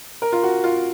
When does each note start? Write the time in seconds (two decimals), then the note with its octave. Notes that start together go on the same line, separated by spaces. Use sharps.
0.22 A#4
0.32 F4
0.43 F#4
0.64 F4